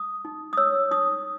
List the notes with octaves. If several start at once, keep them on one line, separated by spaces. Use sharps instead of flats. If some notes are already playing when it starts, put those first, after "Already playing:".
Already playing: D#6
D#4
D#6
C#5 E6
D#4 D#6